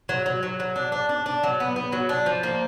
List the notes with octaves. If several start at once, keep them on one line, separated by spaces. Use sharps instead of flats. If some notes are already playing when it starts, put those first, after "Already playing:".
F#3
F#3
F#3
F#3
D4
D4
D4
D4
F#3
B3
B3
F#3
D4
F3
A#3